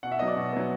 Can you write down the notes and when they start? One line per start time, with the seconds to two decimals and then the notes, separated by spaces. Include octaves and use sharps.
0.03 B2 F#5
0.12 E5
0.19 F#3 B3 D#5
0.28 D5
0.37 B2
0.53 F#3 B3